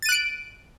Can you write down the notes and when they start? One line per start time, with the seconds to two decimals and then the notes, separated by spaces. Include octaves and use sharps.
0.02 A6
0.06 D#7
0.09 F#6
0.12 D7